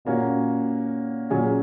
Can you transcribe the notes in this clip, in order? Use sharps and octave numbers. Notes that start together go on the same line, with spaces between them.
A#2 A#3 C#4 F#4
A#2 F#3 C#4 G#4